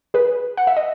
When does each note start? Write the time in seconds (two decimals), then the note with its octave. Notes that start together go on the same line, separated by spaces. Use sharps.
0.14 G#4 B4
0.57 F#5
0.67 E5
0.77 D#5